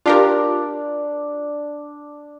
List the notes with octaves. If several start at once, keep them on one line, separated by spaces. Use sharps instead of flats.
D4 F4 G4 A#4